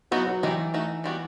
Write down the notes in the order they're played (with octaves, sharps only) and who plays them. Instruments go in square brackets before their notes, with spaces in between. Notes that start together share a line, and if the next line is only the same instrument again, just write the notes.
[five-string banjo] E3 B3 D#4 F#4 [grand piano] F#3
[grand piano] F#3
[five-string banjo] D#3 G3 D#4 [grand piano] E3
[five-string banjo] A3 D#4 F#4
D#3 G3 B3 F#4